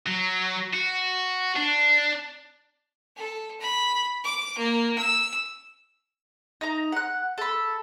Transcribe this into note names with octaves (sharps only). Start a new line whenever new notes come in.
F#3
F#4
D4
A4
B5
D6
A#3
E6
D#4 A#5
F#5 F#6
A4 B5